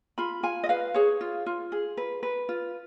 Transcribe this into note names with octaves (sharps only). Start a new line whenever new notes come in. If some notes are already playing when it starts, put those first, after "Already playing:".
F4 B5
F4 G#5
D#5
B4 F5
G#4 C#5
F4
F4
G#4
B4
B4
F4